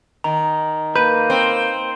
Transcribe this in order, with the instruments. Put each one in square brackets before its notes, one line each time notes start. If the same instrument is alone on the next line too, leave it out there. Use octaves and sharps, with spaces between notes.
[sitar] D#3 [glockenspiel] A#5
[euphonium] A#3 [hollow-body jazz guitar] B4 [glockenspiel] G6 D#7
[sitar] C4